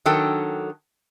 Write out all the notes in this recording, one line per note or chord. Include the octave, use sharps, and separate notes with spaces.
D#3 F#3 D4 A4 G5